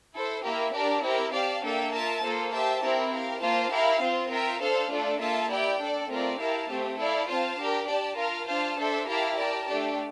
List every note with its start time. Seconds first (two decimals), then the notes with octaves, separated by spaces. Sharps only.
0.13 E4 A4 C5
0.43 A#3 E4 G4 A#4 E5
0.73 D4 G4 A#4 D5 A5
1.03 C4 E4 G4 A#4
1.32 G4 D5 F5 A5
1.63 A#3 D4 A4 E5 G5
1.92 F4 A#4 E5 A5
2.22 A#3 F4 A4 C5
2.52 G4 C5 E5 A5
2.82 C4 E4 G4 A#4
3.11 G4 A#4 F5
3.41 A#3 F4 C5 F5 A5
3.71 E4 G4 A#4 F5
4.01 C4 F4 C5
4.31 F4 A#4 E5 G5
4.61 D4 A4 C5 F5 A5
4.91 A3 D4 F4 A4 D5
5.20 A#3 F4 A4 E5 A5
5.50 E4 G4 D5 G5
5.79 D4 A4 D5
6.10 A3 C4 F4 A#4 D5
6.39 E4 G4 A#4 F5 A5
6.69 A3 C4 G4
6.99 E4 A4 D5 F5
7.29 C4 F4 C5 F5 A5
7.59 D4 G4 A#4
7.88 G4 D5 A5
8.18 F4 A#4 F5 A5
8.48 D4 F4 C5 F5 A5
8.78 D4 A4 C5 E5
9.08 E4 G4 A#4 F5 A5
9.38 G4 A#4 D5 A5
9.67 A3 D4 G4 D5